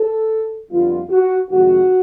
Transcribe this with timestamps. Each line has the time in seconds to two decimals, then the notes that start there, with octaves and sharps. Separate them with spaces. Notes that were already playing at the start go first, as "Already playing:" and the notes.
Already playing: A4
0.69 F2 D3 G3 B3 D#4 F4
1.09 F#4
1.49 F2 C3 D#3 G#3 F#4